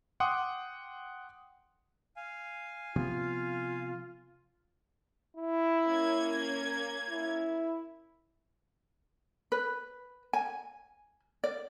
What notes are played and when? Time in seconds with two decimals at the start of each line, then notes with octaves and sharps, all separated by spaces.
0.20 F#5 G5 C6 D6 D#6
2.16 F5 G#5
2.96 C3 F3 B3 F4
5.37 E4
5.83 A#3 C#4 G#6
7.10 E4
9.52 B4
10.33 G#5
11.44 D5